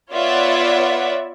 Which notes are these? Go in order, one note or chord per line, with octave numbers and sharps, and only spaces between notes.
B3 F4 C#5 D5 E5 F#5